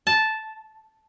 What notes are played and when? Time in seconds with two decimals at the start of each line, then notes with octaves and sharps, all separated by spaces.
0.07 A5